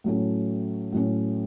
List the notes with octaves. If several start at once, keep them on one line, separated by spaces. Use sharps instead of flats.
A2 F#3 A3 C#4
A2 F#3 A3 C#4